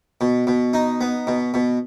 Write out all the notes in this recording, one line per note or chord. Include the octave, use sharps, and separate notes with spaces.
B2
B2
D#4
B3
B2
B2